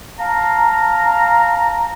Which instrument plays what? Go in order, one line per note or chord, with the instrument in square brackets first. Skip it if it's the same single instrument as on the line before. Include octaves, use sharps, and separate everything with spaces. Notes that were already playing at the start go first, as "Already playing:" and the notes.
[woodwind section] F5 A5 A#5